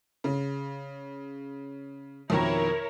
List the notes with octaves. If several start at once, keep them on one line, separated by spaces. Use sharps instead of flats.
C#3
F2 B2 D#3 E4 A#4 C#5